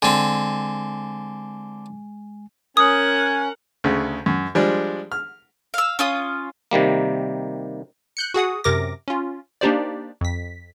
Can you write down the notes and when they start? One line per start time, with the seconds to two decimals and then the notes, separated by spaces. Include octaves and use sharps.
0.02 D3 G#3 C4 G#5
2.77 C#4 A#4 F#5 G#5 D#6
3.84 D2 C#3
4.26 F#2
4.55 F3 G3 G#3 D4
5.12 F6
5.74 F5 E6
5.99 C#4 F4 D#6
6.71 C3 D#3 G3 A#3
8.17 F#6 G6 C#7
8.34 F#4 G#4 F#5 D#6
8.64 F#2 C3 A#4 D6 A#6
9.08 C#4 F4
9.61 A#3 D4 D#4 G4 C5 D5
10.21 F2 B6